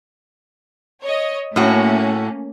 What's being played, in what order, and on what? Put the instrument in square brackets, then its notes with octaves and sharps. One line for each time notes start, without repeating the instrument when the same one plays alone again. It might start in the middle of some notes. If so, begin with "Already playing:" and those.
[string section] C#5 D#5
[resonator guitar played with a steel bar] A2 F#4 [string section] A3 A#3 C#4